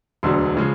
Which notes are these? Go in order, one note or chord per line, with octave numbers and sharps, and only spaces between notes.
E1 D2 D3 F#3 C6
C#3 F3 G#3